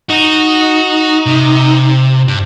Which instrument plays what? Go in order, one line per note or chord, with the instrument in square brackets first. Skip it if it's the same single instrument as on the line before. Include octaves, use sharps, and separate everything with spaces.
[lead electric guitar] D#4 [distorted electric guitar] F#4
[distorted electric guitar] C3
G2